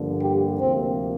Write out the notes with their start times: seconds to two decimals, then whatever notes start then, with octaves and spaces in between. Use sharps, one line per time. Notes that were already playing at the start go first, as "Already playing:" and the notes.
Already playing: G2 D3 F3 A#3
0.20 G4
0.60 D2 C3 F3 A#3 C4